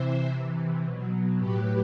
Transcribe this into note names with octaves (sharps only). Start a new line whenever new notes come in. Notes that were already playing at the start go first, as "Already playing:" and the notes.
Already playing: C3 E3 C5 E5
C3 E3
B2 F#3
A2 F#3 G4 B4